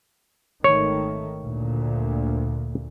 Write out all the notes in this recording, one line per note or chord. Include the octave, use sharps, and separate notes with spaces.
G#1 D#3 A3 C#5
D2 A#2